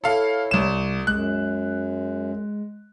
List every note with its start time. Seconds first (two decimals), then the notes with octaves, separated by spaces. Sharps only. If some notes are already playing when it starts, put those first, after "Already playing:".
0.04 E4 A4 C#5 F5
0.51 C2 E7
1.07 F#2 G#3 F#6